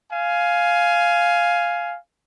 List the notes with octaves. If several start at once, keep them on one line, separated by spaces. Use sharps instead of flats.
F5 G#5